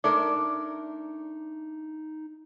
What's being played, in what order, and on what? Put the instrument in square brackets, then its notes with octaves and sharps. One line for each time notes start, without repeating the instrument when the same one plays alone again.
[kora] A3 D4 A#4 [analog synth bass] D#4 [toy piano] D5 D6